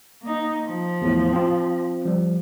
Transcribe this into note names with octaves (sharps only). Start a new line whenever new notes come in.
A#3 D#4
F3
E2 A2
C4 F4
F3 G3